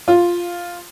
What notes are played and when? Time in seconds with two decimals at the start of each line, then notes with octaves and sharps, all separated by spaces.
0.08 F4